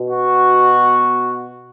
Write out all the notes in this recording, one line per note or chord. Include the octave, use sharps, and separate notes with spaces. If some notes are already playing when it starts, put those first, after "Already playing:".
Already playing: B2
F#4